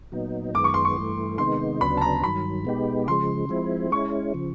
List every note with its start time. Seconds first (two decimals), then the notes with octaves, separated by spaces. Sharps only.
0.12 A#2 F#3 B3 D#4
0.54 F#2 D#3 G#3 B3 D6
0.64 C#6
0.74 C6
0.85 C#6
0.97 G2 E3 A3
1.38 C3 D#3 G#3 B3 D#4 C6
1.81 D2 C#3 F#3 B3 D4 B5
1.97 A5
2.01 A#5
2.22 G2 D#3 F#3 B5
2.65 B2 G#3 B3 D#4 G4
3.07 C#3 F3 G#3 C6
3.49 F3 G#3 C4 E4
3.91 G#3 C#4 E4 C#6
4.34 C#3 F3